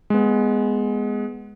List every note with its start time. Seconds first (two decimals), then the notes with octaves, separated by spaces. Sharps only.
0.10 G#3 B3